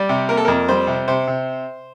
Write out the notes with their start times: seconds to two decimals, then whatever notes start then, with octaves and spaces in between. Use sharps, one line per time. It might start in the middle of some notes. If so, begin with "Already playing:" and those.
Already playing: G3 D5
0.09 C3
0.29 A#3 A#4
0.37 A4
0.45 F2 A#4
0.69 G3 C5
0.87 C3
1.08 C3 C5
1.27 C3